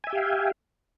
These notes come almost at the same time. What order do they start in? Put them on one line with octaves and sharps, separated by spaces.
G#5 E5 G5 G4 F5